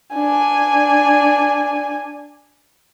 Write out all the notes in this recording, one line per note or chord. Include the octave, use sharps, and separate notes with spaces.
D4 G#5